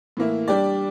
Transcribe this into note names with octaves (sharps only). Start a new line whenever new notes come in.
A2 E3 A#3 E4
G3 D4 G4 D5